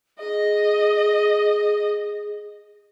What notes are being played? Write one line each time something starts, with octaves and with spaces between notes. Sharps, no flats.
G#4 D#5